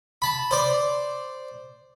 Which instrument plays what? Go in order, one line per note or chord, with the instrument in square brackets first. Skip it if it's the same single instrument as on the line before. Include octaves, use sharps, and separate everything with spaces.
[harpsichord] A5 B5
C5 D5